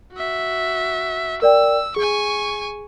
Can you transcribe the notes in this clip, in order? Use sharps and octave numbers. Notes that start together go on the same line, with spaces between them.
F#4 E5
A#4 D5 G5 E6
G#4 G#5 C#6